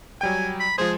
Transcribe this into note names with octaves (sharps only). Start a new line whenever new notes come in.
F#3 G3 G5 G#5
B5
F3 G#3 G#4 C5